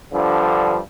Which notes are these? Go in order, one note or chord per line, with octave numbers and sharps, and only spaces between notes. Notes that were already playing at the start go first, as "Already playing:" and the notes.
G2 D3 F3